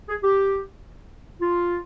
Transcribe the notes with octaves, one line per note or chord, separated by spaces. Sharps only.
G#4
G4
F4